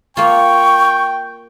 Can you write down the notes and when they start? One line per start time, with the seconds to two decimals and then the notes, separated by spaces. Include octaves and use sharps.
0.17 A#3 F4 G5 C#6